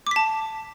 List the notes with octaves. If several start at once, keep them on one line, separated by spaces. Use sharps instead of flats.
A5 D6 B6